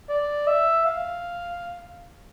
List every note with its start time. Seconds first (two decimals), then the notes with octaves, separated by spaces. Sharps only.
0.09 D5
0.47 E5
0.86 F5